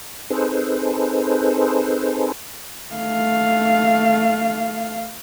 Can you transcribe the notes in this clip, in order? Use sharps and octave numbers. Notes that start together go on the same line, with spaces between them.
C4 D#4 G#4 A4 B4 C5
A3 F5